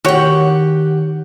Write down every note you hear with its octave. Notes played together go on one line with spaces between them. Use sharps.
D#3 F#4 G4 C#5 F#5 G5